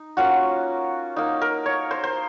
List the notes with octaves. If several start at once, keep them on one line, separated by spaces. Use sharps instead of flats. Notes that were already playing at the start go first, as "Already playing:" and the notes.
Already playing: D#4
A#3 C#4 F4 F#4
A#3 D#4
A#4
C#5
C5
C5